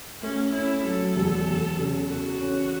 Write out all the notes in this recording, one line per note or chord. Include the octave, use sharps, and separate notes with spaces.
A3 C#4
C#4 E4
F#3 A4
E2
E2
C#3
F#4 A4
C#4